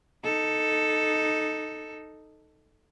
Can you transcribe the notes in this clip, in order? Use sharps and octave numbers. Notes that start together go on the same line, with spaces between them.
D#4 A4